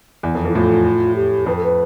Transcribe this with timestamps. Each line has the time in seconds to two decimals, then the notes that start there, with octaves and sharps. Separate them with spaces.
0.23 E2
0.35 F2
0.45 F2 E4
0.55 A2 F4
1.16 G4
1.46 F2 B4
1.56 A4
1.64 B4